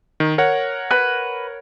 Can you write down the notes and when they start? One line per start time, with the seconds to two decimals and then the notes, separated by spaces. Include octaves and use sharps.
0.20 D#3
0.38 A#4 C#5 F#5
0.91 B4